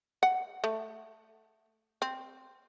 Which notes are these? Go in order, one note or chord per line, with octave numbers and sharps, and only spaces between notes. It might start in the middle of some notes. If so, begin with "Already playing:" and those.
F#5
A3
C4